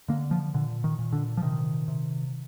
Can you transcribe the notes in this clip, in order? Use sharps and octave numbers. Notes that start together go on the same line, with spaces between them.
D3 A#3
F3
A#2 D3
D#3
A#2
D3
F3
C3 D#3
C3